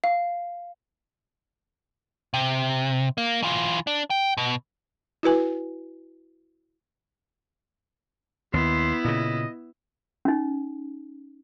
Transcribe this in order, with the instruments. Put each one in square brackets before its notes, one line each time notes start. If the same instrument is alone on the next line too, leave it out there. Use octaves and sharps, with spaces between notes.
[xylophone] F5
[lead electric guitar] C3
A#3
E3 F4
D4
G5
B2
[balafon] E4 F#4 B4 G#5
[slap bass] D#2 [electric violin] B3 E4 [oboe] C6
[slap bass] A#2 C#3 [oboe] D#5
[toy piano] C#4 D#4